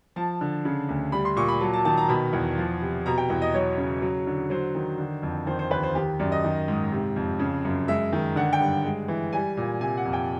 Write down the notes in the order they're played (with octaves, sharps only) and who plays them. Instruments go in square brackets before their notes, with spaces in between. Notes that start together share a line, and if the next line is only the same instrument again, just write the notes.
[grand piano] F3 A5
D3
C#3
D2
G3 B5
C6
A#2 C#6
B5
F#3 A5
A5
D#3 A5
A#5
B2 B5
E2
F3
C3
B2 A#5
G5
E2
D#5
F#3 C#5
C#3
F#3
D3
F#3 C5
D#3
D3
F2
D#3 C5
C5
D#2 B4
C5
D#3 G4
F#2 D5
D#5
D#3
G#2
C3
F2
C#3
F#2
G#3 E5
D#3
D3 F#5
G5
G2
G#3
E3
G3 G#5
A#2
C3 G#5
F#5
F2
G5